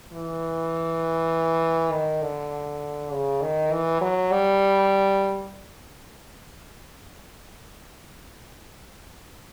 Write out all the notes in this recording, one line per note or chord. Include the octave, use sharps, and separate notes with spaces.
E3
D#3
D3
C#3
D#3
E3
F#3
G3